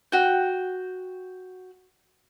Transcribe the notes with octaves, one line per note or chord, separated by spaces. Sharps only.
F#4 G5